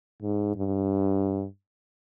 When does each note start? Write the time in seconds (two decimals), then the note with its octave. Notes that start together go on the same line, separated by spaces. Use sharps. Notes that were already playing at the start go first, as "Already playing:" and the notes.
0.22 G#2
0.56 G2